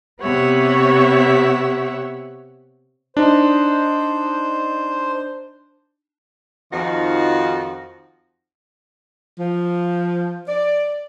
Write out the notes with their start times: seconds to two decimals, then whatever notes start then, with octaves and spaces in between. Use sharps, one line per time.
0.22 C3 B3 G4 C#5 E5 F#5
3.17 D4 D#4 C5
6.72 F2 D#3 F3 D#4 F4 F#4
9.38 F3
10.48 D5